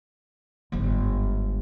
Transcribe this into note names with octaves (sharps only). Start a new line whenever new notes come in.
G1 G#2